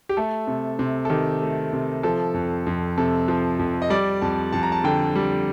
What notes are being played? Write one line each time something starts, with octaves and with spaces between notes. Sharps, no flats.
G4
A3 A4
C3
C3
A4
D#3 G4
A3
C3
F3 A4
F2
F2
C3 A4
F3
F2
D#5
G3 D5
F2 A5
F2 A5
A#5
A5
D3 G5
G3